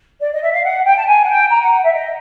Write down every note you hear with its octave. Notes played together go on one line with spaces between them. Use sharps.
D5
D#5
E5
F5
F#5
G5
A5
G#5
F#5
G5
A#5
F#5
F#5
E5
D#5